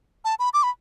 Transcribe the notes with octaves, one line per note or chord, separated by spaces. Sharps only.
A5
B5
D6
B5